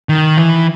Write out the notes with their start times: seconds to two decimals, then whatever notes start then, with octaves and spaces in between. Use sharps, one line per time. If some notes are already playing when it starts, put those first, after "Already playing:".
0.09 D#3
0.37 E3